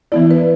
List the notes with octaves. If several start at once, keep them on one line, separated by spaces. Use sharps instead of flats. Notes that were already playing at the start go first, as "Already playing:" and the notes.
E3 B3 E4 D5
B4